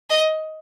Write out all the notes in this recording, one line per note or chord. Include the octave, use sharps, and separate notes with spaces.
D#5